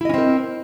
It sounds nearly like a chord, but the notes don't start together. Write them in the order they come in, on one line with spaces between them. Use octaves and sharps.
E4 D#5 C#4 C4 A#4